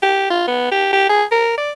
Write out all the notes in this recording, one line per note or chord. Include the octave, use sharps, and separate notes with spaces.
G4
F4
B3
G4
G4
G#4
A#4
D5